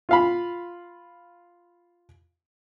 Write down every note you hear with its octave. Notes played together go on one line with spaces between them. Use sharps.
F4 F5 B5